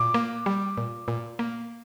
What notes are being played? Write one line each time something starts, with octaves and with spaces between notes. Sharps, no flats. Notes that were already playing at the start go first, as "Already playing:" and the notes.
Already playing: A#2 D6
A#3
G3
A#2
A#2
A#3